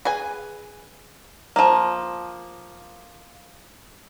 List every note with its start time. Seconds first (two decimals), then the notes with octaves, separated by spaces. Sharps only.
0.05 G#4 B4 G#5
1.56 F3 A#3